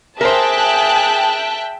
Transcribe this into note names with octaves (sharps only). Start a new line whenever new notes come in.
G#4 A#4 C5 E5 G5 A5 F#6